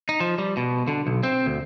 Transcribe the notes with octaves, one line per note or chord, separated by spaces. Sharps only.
D#4
F3
G3
B2
D3
B1
C4
D2